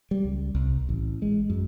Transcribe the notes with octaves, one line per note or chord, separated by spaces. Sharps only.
G3
C#2
C2
A1
G#3
F#2